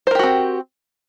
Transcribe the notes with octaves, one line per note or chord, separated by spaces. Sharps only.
C4 F#4 G4 A#4 C5